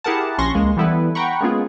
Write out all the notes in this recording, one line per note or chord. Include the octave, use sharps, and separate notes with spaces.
E4 G4 G#4 A#4 F#5 A5
A#1 C#4 C6 C#6 A#6
C#2 G#3 A#3
E3 G3 B3 E4 A4 B4
F#5 G5 A#5 B5 C#6
G#3 A#3 B3 C#4 F4 G#4